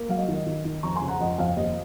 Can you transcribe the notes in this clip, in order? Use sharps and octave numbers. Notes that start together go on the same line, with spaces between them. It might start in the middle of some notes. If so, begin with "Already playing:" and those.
Already playing: A#3
F#3 F5
D#5
D#3
D#5
D#3
D#3
F2 A#5 C#6
G#5 C6
C#3
F#5 A#5
F2 D#5 F#5
F2 F5
D#2 D#5